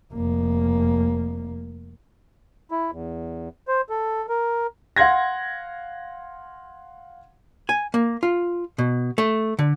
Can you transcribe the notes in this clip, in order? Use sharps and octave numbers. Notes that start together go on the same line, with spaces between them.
F1 A#3
E4
E2
C5
A4
A#4
F5 F#5 C6 G#6 A#6
G#5
A#3
F4
B2
A3
D3